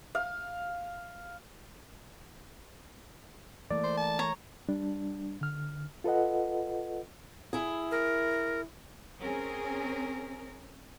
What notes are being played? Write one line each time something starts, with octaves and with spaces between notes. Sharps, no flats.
F5
E3 A3 A#3 D5
C5
A5
C#5 A#5
G3 D4
D3 F6
F4 A4 B4 D#5 F#5
E4 G#4
A#4
C4 C#4 G#4 A#4